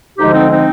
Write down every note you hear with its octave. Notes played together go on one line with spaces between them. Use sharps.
D2 D3 F3 G#3 D#4 G4
C4 D#4
C4 D#4